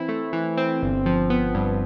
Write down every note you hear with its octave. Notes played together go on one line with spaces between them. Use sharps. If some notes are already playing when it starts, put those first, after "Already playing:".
Already playing: E3 C4 E4
A3
E3
C4
G1
F3
B3
G2